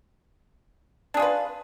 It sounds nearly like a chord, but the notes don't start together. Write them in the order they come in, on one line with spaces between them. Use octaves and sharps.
D4 G#4 F4 B4